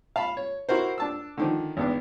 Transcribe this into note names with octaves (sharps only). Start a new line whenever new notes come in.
F5 A5 B5
C#5
E4 F#4 A#4 C5
D4 A5 E6
D3 D#3 F3
G#1 B3 D4